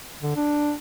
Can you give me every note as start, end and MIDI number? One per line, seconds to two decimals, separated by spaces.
0.22 0.35 50
0.36 0.72 62